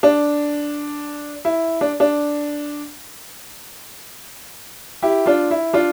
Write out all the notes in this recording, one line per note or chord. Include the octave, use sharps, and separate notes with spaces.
D4
E4
D4
D4
E4 G4
D4 F4
E4
D4 F4